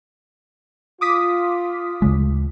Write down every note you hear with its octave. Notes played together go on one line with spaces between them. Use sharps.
F4 D6 D#6 B6
D2 C#3 G#3